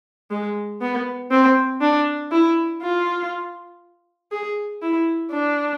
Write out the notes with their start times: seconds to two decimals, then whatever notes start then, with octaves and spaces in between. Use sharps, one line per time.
0.30 G#3
0.81 B3
1.31 C4
1.81 D4
2.31 E4
2.82 F4
4.31 G#4
4.82 E4
5.31 D4